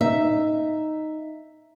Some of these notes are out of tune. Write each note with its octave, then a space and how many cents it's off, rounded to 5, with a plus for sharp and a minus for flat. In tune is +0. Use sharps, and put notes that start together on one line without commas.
D#4 +0 E5 +0